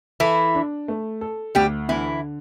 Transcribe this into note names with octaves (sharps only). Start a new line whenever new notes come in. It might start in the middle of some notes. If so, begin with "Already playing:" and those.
E3 E4 A4
D4
A3
A4
D2 G3 G4
D3 E3 E4